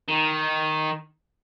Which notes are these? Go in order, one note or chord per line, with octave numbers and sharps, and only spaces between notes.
D#3